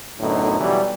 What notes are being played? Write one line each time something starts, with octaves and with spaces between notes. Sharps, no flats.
F#2 A2 D3 B3 D#4
B2 E3 F#3 G3